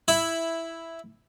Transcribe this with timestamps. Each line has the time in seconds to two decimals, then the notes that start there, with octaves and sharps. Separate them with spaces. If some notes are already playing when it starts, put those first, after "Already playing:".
0.08 E4